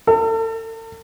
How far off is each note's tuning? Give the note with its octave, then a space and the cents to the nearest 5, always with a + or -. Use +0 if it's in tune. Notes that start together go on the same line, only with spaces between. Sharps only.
A4 +40